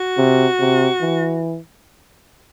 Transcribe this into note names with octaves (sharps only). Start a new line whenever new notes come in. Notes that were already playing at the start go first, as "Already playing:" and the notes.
Already playing: F#4
C3
C3
E3